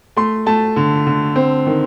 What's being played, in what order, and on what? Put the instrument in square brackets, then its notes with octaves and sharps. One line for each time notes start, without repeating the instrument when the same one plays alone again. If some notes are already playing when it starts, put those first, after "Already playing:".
[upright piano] A3 C6
A3 A5
D3
D3
C4
D#3